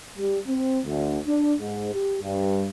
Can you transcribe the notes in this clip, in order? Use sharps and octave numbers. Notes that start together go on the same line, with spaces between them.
G3
C4
D2
D4
G#2
G4
G2